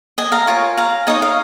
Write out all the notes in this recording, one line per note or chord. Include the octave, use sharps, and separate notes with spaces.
D#5 G#5
F5 A#5
F4 A#4 C#5 G#5 C#6
F5 A#5
D#4 C#5 D#5 G#5
F5